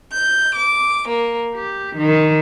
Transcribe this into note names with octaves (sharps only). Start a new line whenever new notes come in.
G6
D6
A#3
G4
D#3